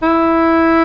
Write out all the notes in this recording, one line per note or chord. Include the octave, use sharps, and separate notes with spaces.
E4